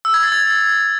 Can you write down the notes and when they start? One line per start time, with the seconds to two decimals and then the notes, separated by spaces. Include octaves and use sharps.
0.05 E6
0.14 G#6
0.23 A6
0.32 G#6